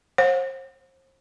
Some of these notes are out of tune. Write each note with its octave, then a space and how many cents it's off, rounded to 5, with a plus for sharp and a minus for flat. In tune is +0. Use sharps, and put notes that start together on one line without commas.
C5 +35 F#5 -45